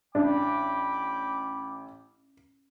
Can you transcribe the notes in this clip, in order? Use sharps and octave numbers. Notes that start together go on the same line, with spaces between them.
A1 D4 G5 B5 D6